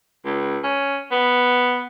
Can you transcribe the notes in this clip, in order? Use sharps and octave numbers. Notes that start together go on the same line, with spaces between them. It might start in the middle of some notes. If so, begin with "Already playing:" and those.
C#2
C#4
B3